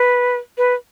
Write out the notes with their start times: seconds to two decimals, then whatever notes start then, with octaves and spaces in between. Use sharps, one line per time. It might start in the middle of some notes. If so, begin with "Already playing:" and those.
Already playing: B4
0.58 B4